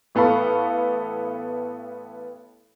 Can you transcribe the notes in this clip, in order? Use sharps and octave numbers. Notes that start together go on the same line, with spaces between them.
A1 B3 A4 F5 B5 C#6